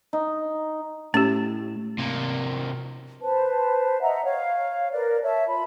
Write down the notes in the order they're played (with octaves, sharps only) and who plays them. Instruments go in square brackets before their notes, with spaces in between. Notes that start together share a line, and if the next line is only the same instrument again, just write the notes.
[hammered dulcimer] D#4
[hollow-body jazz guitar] A2 [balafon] C#4 G4
[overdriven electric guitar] C3 A#3
[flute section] B4 C5 A5
D#5 E5 F#5 A#5
C#5 F5
A#4 B4 D5
C#5 E5 A5
F4 B5